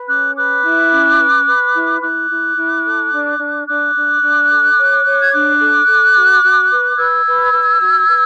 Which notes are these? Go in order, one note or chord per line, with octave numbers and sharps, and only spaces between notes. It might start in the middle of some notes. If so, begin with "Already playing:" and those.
Already playing: B4
C#4 D6 F#6
B4 D6 F#6
E4
C#4
B4
B4
E4
E4 D6 F#6
E4
E4
A4
D4
D4
D4 D6 F#6
D4
D4
A4
C#5
C#5
G#6
D4 D6 F#6
A4
A4
F#4
F#4
B4
B4 E6 G#6
B4
B4
F#4
B4